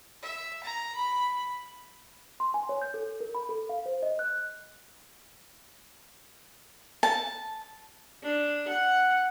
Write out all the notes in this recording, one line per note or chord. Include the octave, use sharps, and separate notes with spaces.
E5
A#5
B5
C6
G#5
C#5
G6
A4
A#4
B5
A4
F5
C5
D#5
F#6
A5
D4
F#5